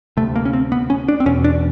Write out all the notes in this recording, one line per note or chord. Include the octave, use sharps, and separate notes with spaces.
D2 C3 A3
A#3
C#4
C4
B3
C#4
D4
C4
E2 B2 C#4
D4